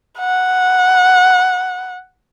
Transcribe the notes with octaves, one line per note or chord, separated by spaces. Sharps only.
F#5